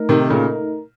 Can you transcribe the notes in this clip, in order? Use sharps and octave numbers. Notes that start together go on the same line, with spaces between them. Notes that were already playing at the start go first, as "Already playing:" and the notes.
Already playing: A3 D#4 A#4
C3 D#3
A#2 C#3